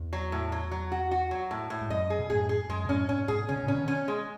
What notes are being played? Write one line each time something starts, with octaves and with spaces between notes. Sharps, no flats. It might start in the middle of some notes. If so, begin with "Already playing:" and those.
Already playing: E2
F#3
A2
F#3
F#3
F#4
F#4
F#3
A2
A2
G#2
F#2 D#5
G#4
B2
F#2 A2 G#4
G#4
F#2 G#3
B2
F#2 A2 C#4
G#2 B2 C#4
G#2 B2 G#4
C#3 C#4
B2
A2 C#3
C#4
B2 D#3
C#4
G#3